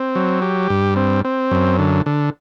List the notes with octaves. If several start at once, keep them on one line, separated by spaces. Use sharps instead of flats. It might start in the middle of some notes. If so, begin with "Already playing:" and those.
Already playing: C4
F#3
G4
G2
C4
C4
F#2
D3
D3